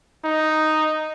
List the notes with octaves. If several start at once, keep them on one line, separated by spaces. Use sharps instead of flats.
D#4